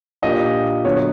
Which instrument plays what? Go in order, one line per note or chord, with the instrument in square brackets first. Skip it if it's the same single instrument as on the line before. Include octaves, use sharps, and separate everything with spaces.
[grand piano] A#2 F3 A#3 D4 G4 [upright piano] D#5
[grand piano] D3 F#3 B3 [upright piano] C#5